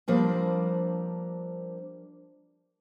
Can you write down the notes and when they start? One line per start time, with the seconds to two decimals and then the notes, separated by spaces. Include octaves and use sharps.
0.08 F3 G3 A#3 C4 D4